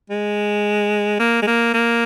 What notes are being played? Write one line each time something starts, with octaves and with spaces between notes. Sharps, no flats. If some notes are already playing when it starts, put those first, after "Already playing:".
G#3
A#3
G#3
A#3
A#3